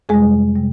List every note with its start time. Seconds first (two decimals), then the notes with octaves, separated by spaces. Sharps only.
0.09 F2 C3 G3 G#3 G#4
0.55 C3 G3